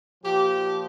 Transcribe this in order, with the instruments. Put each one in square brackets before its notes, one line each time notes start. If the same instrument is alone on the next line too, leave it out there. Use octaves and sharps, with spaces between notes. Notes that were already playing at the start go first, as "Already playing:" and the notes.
[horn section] A#2 F3 G4